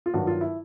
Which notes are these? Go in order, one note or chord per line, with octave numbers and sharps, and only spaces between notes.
F4
G2 D#3 F#3 F#4
F4
E4